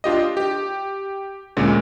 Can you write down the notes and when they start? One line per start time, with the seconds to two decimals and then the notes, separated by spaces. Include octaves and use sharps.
0.04 D4 F4 G4 D#5
0.37 G4
1.57 D2 A#2 G#3 C#4